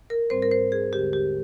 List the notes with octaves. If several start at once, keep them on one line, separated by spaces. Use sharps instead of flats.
A#4
G#2 G3 C4 C5
A#4
C5
G#4
D#2 D3 G#3 G4
G4